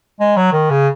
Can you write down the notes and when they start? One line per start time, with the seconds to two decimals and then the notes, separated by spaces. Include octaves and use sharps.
0.20 G#3
0.36 F#3
0.53 D#3
0.70 C#3